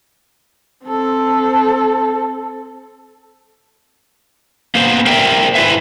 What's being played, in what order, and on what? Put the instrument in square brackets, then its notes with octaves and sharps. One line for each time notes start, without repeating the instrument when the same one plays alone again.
[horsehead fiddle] C4 A4
[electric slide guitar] A#3 B3 C5
A#4 C5 D5 E5 G5
G#2 G#3 E4 B4 E5